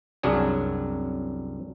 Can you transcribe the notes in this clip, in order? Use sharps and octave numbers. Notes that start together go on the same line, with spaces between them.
C2 F#2 F#3 D4 G#4